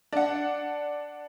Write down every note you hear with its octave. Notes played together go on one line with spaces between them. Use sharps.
D4 F#5